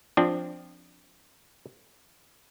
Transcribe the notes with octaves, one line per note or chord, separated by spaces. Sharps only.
F3 C4 D4